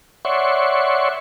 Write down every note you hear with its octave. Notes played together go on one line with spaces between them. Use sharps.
C#5 D5 E5 F#5 C6 C#6